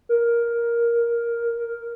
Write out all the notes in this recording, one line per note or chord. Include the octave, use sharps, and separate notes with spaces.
A#4